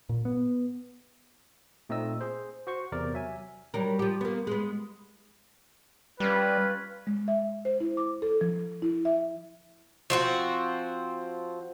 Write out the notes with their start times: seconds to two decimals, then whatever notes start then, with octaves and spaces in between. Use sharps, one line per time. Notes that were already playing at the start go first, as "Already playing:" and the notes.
0.09 A#2
0.25 B3
1.89 A#2 A3 C4 D#4 D#5 E6
2.21 G#4 C5
2.67 F#4 C5 C#6
2.92 E2 C3 A#4 D5
3.14 F#3 E5 G#5
3.74 F#3 G3 A#4
3.99 F3 G4
4.21 A#3 B3
4.47 G#3 B3
6.20 G3 C#4 F4 B4
7.07 G#3
7.28 E5
7.65 C5
7.81 E4
7.97 D6
8.22 A4
8.41 F3
8.82 E4
9.05 E5
10.10 F3 C4 F#4